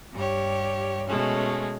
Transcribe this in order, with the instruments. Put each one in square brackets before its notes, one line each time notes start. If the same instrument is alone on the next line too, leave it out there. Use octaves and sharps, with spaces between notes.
[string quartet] G2 G4 C#5
B2 G#3 A3 C#4